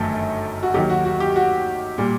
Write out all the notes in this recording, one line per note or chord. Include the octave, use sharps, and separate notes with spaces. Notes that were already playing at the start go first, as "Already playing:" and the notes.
Already playing: G1 F#2 D#3 F#3 A3 A4
F#4
D#2 D#3 F#3 G4
F#4
F#4
G4
F#4
A#2 G3